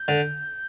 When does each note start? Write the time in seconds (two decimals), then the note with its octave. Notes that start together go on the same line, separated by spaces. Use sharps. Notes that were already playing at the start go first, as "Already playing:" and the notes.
Already playing: G6
0.08 D3